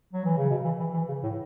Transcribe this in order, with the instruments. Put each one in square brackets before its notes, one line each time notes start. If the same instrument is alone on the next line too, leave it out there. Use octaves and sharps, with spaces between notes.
[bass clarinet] F#3
E3
C#3
B2
E3
E3
E3
C#3
A2